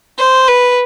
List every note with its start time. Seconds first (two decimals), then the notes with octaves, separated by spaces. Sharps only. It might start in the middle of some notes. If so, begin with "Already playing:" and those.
0.18 C5
0.48 B4